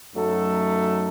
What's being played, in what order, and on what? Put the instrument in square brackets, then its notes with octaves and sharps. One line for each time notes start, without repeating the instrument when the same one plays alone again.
[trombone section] F#2 F#3 A3 D#4 A4